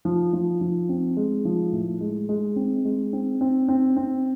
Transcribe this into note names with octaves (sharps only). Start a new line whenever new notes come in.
F3
F3
F3
C4
G#3
F3
A2
G#3
G#3
C4
G#3
C4
C4
C4
C4